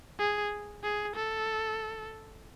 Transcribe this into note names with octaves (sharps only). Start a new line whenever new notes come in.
G#4
G#4
A4